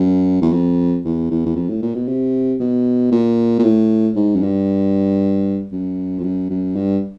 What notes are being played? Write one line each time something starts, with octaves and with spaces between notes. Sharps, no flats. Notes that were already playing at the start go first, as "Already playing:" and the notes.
Already playing: F#2
E2
F2
E2
E2
E2
F2
A2
A#2
B2
C3
B2
A#2
A#2
A2
G#2
F#2
G2
F#2
F2
F#2
F#2
G2